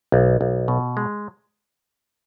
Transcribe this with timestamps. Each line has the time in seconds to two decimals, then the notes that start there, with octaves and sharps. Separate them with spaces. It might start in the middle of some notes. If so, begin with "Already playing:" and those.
0.12 B1
0.41 B1
0.68 B2
0.97 G#3